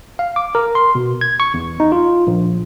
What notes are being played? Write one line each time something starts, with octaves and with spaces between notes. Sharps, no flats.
F5
D6
A#4
C6
B2
G#6
C#6
E2
D#4
F4
A#1